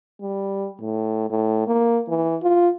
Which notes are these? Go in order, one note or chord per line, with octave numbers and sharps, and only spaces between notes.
G3
A2
A2
A#3
E3
F4